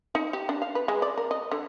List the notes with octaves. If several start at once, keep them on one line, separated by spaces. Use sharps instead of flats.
D#4
G4
D4
F5
B4
G#3
D5
A#4
D#5
D3